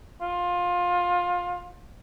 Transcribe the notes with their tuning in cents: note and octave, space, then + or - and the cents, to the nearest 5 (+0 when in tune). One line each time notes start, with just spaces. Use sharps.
F4 +20